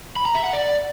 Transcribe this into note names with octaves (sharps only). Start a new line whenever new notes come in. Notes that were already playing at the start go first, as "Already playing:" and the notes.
B5
A#5
E5
F#5
D5